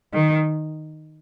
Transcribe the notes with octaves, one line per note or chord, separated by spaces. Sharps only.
D#3